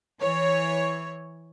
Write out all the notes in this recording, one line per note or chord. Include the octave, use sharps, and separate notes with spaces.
E3 C#5